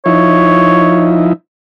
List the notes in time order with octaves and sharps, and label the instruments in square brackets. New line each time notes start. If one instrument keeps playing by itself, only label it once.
[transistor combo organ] F3 D#4 E4 [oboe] C#5